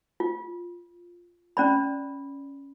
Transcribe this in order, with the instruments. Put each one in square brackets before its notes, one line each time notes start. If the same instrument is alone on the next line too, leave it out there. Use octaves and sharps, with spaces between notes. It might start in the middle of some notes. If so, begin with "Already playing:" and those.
[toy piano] F4
C#4 D5 B5